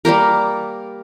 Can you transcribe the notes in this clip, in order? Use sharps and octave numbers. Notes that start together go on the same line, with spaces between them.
G3 A#3 G4 A#4